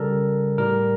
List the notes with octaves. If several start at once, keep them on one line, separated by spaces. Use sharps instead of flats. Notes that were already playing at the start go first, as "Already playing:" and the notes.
Already playing: C#3 G3 A4 A#4
A2 G3 A#4